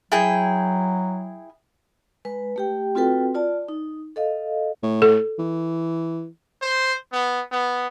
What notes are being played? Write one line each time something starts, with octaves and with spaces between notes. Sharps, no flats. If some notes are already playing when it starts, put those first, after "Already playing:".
F#3 E4 G#4 G5
G#3 B4
A3 G4 G5
C4 F4 F#4 A4 B4 G5
F4 D5 A5
D#4
A4 D#5 F5
A2
A4
E3
C5
B3
B3